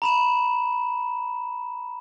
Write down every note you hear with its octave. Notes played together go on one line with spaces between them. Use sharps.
A#5 B5 E7